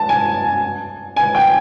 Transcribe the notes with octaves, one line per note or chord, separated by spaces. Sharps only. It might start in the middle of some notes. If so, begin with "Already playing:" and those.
Already playing: A5
G#5
G#5
G5